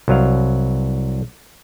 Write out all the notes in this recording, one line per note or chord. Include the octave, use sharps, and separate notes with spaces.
C2 F#3 F5